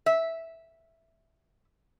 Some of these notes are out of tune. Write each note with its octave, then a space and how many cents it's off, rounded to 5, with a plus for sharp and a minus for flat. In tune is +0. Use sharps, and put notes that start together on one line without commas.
E5 -5